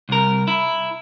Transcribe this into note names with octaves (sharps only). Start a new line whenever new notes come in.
C2 A#4
E4